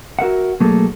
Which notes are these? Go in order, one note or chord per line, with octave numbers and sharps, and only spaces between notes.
F#4 A#4 E5 F#5
B1 F#3 A3 A#3 G#4 A4